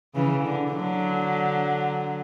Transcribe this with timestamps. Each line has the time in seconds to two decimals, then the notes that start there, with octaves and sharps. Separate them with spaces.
0.15 C#3 E3
0.43 D3
0.71 D3 F#3